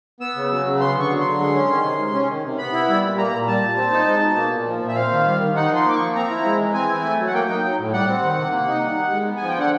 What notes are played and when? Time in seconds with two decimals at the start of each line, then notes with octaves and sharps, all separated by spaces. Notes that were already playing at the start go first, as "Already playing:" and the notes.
0.20 B3 E6
0.36 C#3
0.51 F#3
0.66 C#3
0.80 B3 C6
0.95 D3 C#6
1.10 F#3
1.21 D3 C6
1.40 G#3
1.55 C#4
1.69 D#3
1.84 C3
1.99 G#3
2.14 C#4
2.28 D#3
2.44 C3
2.58 B3 B5
2.73 E4
2.88 G3
3.03 A#2
3.18 A#3 A#5
3.33 A#2
3.47 G3 A5
3.63 A#2
3.77 C4
3.92 D#4
4.07 G#3
4.23 B2
4.36 A#3
4.51 A#2
4.67 F3
4.82 A#2
4.88 E5
4.96 C4 F5
5.11 D#3
5.26 G3
5.40 D#3
5.56 D#4 F#5
5.70 F3
5.76 C6
5.85 A#3 D6
5.95 F3 C#6
6.15 C4 A#5
6.30 E4
6.45 G#3
6.60 E3
6.74 C4 G#5
6.89 E4
7.04 A3
7.19 F#3
7.27 F#5
7.34 A#3 G5
7.49 D#4
7.63 F#3
7.79 A2
7.93 G3 F#5
8.08 C4
8.23 D#3
8.38 C3
8.53 A#3
8.67 D#4
8.82 G3
8.97 D#3
9.12 G#3
9.27 B3
9.37 G#5
9.42 F3
9.48 G5
9.56 D3 F#5